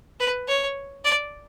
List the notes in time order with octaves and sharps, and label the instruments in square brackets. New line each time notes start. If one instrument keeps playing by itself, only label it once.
[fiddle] B4
C#5
D5